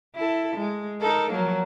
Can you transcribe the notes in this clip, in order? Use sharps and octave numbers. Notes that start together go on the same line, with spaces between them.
E4 A4
G#3
D#4 A4 A#4
F3 F#3 A#3